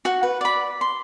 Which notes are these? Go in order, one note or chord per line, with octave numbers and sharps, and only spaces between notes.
F#4 F#5
B4
D5 B5
C6